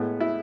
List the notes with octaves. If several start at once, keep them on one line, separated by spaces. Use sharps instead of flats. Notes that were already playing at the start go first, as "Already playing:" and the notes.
Already playing: A2 G#3 B3
E4